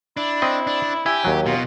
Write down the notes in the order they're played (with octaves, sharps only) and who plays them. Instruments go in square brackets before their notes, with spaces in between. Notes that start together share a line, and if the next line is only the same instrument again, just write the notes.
[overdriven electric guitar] D4 [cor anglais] E4
[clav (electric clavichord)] C4 D#5
[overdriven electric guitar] D4
[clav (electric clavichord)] E4 [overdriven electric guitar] G4 [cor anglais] G#5
[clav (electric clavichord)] D#2 F#3
[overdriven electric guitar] B2 [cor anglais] F4